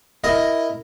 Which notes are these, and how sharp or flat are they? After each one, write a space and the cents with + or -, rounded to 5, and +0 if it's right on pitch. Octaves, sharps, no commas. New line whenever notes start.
E4 +0 A#4 +0 D#5 +0